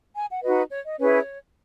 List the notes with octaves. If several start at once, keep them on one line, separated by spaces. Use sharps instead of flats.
G#5
F#5
D#4 F#4 B4 D#5
C#5
D#5
C#4 E4 G#4 B4 C#5